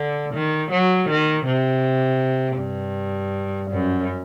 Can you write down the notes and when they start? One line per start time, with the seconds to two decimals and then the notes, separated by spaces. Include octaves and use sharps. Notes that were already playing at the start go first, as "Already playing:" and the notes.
Already playing: D3
0.34 D#3
0.71 F#3
1.09 D#3
1.46 C3
2.59 G2
3.71 F#2